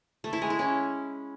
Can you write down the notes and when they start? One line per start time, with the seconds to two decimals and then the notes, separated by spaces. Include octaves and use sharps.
0.24 A3
0.33 E4
0.42 G#3
0.50 E4
0.59 C#4